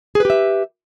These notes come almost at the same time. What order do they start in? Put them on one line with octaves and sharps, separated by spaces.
G#4 B4 G4 E5